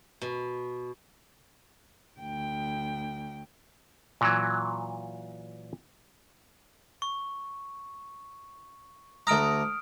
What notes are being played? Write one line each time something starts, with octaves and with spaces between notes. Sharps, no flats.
B2
D2 G5
A#2 E3 F#3
C#6
D2 A#5 D#6 F6 D7